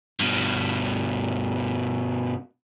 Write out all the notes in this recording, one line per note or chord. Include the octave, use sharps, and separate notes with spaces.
G2 B2